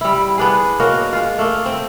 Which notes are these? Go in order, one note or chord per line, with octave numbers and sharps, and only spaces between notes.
G3 E4
B3 D4 G#4
A#3 F#4 C#5 D#5
G#3 F4
A3 A#3
C4